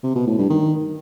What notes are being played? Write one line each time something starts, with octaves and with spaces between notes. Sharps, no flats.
C3
B2
A2
G2
D#3